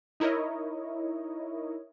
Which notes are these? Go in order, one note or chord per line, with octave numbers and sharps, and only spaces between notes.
D#4 E4 A#4 C#5 D#5